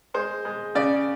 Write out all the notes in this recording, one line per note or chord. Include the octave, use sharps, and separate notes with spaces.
G#3 C5
G#3
C#3 D5